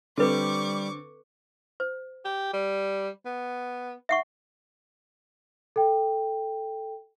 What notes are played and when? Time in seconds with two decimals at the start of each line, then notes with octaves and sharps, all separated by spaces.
0.18 D3 G3 C4 A4 B4 C#6 D6
1.80 C5
2.25 G4
2.53 G3
3.25 B3
4.09 E5 F#5 C#6
5.76 A4 G5